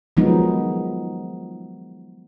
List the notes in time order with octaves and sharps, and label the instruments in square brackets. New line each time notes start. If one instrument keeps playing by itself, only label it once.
[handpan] D#3 F3 F#3 G#3 B3 D#4